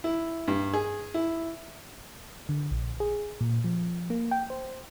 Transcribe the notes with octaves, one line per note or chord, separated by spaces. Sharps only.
E4
G2
G#4
E4
D3
A#1
G#4
A#2
F3
A#3
G5
C5